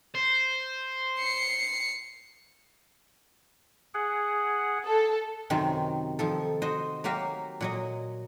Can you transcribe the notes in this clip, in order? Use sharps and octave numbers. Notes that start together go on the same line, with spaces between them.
C5
C7 C#7
G#4 F#5
A4
F#2 C3 D#3 C4
D#3 F3 A4
F#4 C5 D#5
F#3 A#3 F#4 G4 F5
A#2 F#3 D#5